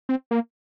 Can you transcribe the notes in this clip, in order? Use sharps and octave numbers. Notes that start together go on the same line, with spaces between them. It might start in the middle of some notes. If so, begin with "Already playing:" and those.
C4
A#3